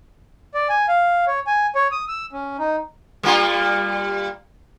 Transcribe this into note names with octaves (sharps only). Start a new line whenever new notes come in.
D5
G#5
F5
C#5
G#5
C#5
D#6
E6
C#4
D#4
G3 A#3 F4